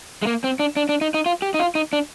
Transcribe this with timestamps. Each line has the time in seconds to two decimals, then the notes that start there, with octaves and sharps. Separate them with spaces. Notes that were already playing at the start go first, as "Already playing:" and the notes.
0.22 G#3
0.27 A#3
0.44 C4
0.59 D4
0.76 D4
0.89 D4
1.01 D#4
1.14 D#4
1.26 F4
1.42 G4
1.54 D#4
1.60 F4
1.75 D#4
1.93 D4